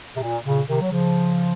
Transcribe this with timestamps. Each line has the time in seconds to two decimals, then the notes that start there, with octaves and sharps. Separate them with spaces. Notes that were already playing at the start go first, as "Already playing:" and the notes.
0.15 C3
0.21 A#2
0.44 A#2 C#3
0.68 C3 D#3
0.81 F#3
0.91 C#3 F3